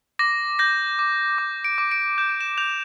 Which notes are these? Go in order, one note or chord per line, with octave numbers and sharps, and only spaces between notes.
D6 A#6
G6 A#6
D6
D6
D7
D6
D7
G6 E7
D7
E7
G6 F7